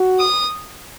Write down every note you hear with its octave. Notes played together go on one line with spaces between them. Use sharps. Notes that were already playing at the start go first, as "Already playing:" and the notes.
Already playing: F#4
D#6